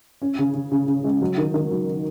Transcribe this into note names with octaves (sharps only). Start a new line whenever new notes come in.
C#4
C#3
C#3
C#3
C#3
G#3
F#3
D#3
D#3
F#3